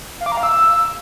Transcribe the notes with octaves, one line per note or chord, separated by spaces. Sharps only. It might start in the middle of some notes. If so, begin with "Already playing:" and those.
F5
D6
A#5
F5
E6